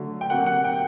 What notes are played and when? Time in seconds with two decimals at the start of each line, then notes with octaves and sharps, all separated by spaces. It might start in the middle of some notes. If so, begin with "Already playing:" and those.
Already playing: D3 F#3 A3
0.21 G5
0.30 C3 F#3 A#3 F#5
0.46 F#5
0.64 G5